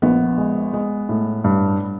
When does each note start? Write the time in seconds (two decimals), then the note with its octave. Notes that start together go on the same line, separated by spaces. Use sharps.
0.02 A#1 B3
0.38 G#3
0.73 G#3
1.09 A2
1.44 G2